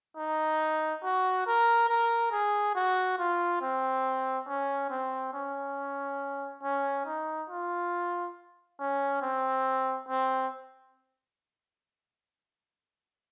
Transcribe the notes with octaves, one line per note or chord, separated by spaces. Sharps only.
D#4
F#4
A#4
A#4
G#4
F#4
F4
C4
C#4
C4
C#4
C#4
D#4
F4
C#4
C4
C4